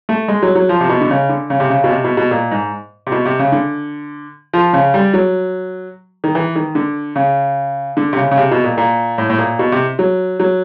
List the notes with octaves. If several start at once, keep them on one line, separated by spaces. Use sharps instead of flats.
A3
G#3
F#3
F#3
F3
C3
B2
D3
C#3
D3
C#3
C3
C#3
B2
C3
B2
B2
A#2
G#2
C3
B2
C3
C#3
D3
F3
C#3
G3
F#3
D#3
E3
D#3
D3
C#3
D3
C3
C#3
C#3
C3
B2
A#2
A#2
A2
A2
A#2
B2
C3
F#3
F#3